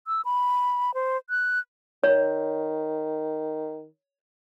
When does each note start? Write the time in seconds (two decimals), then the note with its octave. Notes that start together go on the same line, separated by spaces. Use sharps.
0.07 E6
0.25 B5
0.94 C5
1.30 F#6
2.04 D#3 C#5